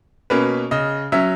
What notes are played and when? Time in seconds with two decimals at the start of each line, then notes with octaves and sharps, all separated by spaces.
0.30 B2 A#3 C#4 B4
0.71 C#3 D#5
1.12 F#3 C#4 E5